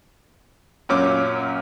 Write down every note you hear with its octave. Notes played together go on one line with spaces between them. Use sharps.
F#2 A#2 C#4 D6